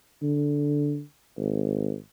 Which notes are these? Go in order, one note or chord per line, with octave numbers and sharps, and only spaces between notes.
D3
G#1